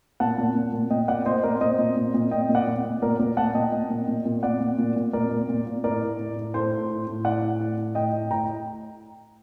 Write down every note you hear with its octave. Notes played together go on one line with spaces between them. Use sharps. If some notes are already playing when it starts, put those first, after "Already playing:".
A#2 F#5 A5
A#2
A#2
A#2
A#2 D#5 G5
A#2 D5 F#5
A#2 C5 D#5
A#2 A#4 D5
A#2 C5 D#5
A#2
A#2
A#2
A#2 D#5 G5
A#2
D5 F#5
A#2
A#2
A#2 A#4 D5
A#2 A#4 D5
A#2 F#5 A5
A#2 D#5 G5
A#2
A#2
A#2
A#2
A#2 D5 F#5
A#2
A#2
A#2
A#2 A#4 D5
A#2
A#2
A#2
A2 A#4 D5
A2
A2
A2
A2 A4 C5
A2
A2
A2
A2 D5 F#5
A2
A2
A2
A2 D#5 G5
A2
A2 G5 A#5